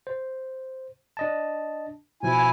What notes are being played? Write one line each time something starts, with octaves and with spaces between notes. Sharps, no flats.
C5
D4 D#5 A5
B2 F3 E4 G#5